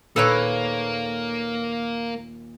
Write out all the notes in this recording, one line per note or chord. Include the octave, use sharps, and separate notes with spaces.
D#2 A#2 A#3 A4 B4 C#5